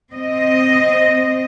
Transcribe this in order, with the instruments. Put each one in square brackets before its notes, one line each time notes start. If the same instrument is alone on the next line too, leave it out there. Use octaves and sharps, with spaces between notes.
[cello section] C4 D#5